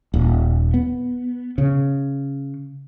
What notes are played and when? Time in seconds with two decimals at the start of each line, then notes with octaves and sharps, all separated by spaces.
0.14 D#1
0.74 B3
1.58 C#3